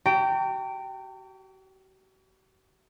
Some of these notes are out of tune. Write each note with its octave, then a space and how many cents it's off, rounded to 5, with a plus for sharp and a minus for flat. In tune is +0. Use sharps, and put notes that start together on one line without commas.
F#4 +40 G5 -10 A#5 -45